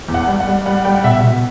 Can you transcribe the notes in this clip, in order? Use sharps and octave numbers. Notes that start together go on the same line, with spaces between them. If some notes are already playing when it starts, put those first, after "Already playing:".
E2
F#5
G3
F#5
G3
G3 F#5
G3 G5
F#5
B2 E5
B2